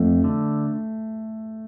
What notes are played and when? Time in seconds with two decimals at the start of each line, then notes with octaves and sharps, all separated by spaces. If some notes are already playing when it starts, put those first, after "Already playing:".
Already playing: F2 A3
0.24 D3